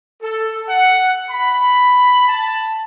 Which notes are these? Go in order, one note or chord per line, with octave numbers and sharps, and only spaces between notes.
A4
F#5
B5
A5